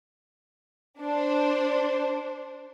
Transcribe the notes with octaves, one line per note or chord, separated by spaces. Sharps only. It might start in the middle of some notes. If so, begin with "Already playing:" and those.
D4 C5